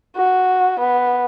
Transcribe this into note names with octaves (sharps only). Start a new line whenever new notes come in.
F#4
B3